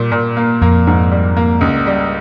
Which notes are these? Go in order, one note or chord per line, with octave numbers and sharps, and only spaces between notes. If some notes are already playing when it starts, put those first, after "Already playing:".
Already playing: A#2 G3
A#2
A#3
F2 A#3
G#2
G3
A#3
C#2
G3